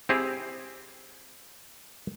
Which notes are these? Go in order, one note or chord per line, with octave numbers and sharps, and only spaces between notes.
C4 E4 G4 G#4